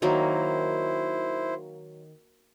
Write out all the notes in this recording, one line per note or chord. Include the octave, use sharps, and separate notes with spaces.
D#3 F#3 A#3 E4 C5